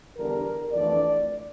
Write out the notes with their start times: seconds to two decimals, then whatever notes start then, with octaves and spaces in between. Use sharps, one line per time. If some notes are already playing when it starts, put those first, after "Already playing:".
0.17 E2 D3 G3 D4 A#4
0.72 F2 E3 A3 D4 D5